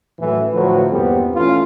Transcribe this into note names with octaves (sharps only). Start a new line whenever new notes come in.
F#2 A2 E3
A2 D3 F3 F#3 B4
E2 G2 A#2 G3 B3 C4
E3 A3 C#4 E4 F4